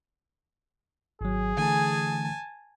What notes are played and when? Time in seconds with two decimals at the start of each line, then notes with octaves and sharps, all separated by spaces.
1.21 G#1 F#3 G#4
1.57 D3 E3 A3 G#5 A5